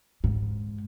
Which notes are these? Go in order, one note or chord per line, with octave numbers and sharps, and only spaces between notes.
G#2